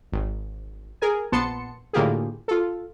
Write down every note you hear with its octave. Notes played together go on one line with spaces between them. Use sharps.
G#1
G#4 A#4 G#5
A#1 B3 A5 C6 C#7
A2 D3 A#3 F4 G4 G#4
F4 A4